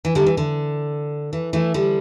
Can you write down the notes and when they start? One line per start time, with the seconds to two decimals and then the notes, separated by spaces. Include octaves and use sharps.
0.05 E3
0.15 D3 G3
0.27 E3
0.37 D3
1.33 E3
1.53 E3 A3
1.74 D3 G3